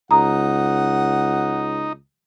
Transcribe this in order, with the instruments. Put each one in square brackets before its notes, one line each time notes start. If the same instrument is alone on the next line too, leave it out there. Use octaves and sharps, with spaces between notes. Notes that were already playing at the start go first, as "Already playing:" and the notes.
[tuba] C#2 [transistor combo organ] D#4 [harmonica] F#5 [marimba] A#5 D#6